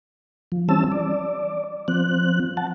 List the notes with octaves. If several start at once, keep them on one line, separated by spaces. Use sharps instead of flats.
F3
E3 G3 C4 C#4 A5 E6
D5
F3 C4 F#6
F#5 A5